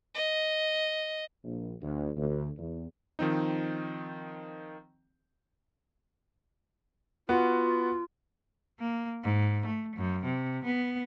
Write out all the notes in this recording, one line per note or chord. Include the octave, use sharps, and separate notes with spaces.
D#5
A#1
D2
D2
E2
D#3 F3 C4 D#4
B3 F4 F#4
A#3
G#2
A3
F#2
C3
B3